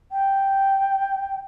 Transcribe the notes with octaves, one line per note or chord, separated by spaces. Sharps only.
G5